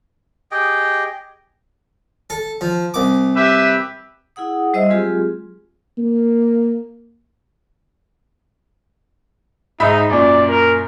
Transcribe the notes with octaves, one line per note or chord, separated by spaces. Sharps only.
G4 G#4 D#5 G5
A4
F3
C2 D6
G4 B4 E5
E4 G#4 F#5 D#6
G3 C5 D#5 E5 E6
F#3 G#3 C4 F4 G4 G#4
A#3
G#2 D#4 E5 B5
F#2 A#2 D5
A#4